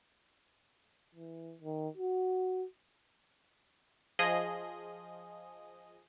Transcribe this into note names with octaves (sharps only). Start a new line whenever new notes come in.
E3
D#3
F#4
F3 G#4 D#5